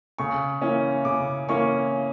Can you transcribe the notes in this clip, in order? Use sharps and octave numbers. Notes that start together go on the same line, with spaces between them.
C#3 C#6
E3 A#3 C#4
C#3 D6
E3 A#3 C#4 C#6